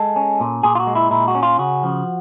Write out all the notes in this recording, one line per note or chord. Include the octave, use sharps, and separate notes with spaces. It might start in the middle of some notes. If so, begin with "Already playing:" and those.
Already playing: G#3 A4
C#4
A#2
A#2 G#4
F4
F#4
G#3
E4
A#2 E4
F#4
C#4
F4
C#3 F#4
F3